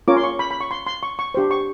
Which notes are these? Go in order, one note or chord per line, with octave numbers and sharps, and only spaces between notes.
C#4 F4 A#4 C#5 D6
C6
C#6
B5
B5
C#6
C6
C6
C#6
C#6
D4 G4 C5
C#6